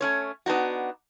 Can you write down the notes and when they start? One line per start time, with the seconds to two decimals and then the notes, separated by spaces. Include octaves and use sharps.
0.01 A3 C#4 C#5
0.46 B3 D4 D#4 F#4